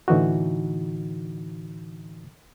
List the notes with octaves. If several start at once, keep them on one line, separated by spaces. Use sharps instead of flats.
A2 D3 E3 D#4 F#4